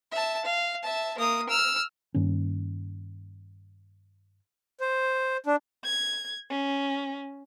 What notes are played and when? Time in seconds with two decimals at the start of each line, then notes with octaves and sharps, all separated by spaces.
0.11 E5 A5
0.45 F5
0.83 E5 A5
1.18 A#3 D#6
1.49 E6 F6
2.14 G2 D#3 A#3 C#4
4.80 C5
5.46 D4
5.84 G#6
6.50 C#4